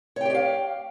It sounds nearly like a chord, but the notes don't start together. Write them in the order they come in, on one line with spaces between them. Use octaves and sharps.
C#5 G5 G4 D5 F5